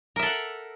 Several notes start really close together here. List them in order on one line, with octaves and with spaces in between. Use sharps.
A#4 E5 A4 F#5